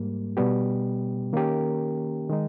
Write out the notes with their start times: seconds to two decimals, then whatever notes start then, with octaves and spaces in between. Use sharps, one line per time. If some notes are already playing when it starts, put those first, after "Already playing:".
Already playing: G#2 G3 A#3
0.37 B2 G3 B3 G4
1.33 D#3 A#3 C#4 G4 A#4
2.29 D#3 G#3 D#4